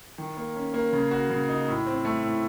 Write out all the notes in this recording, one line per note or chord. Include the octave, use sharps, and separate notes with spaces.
D#3
A#3
C#4
A#3
C#3
F#4
C#3
D#4
A2
C4
A3
A2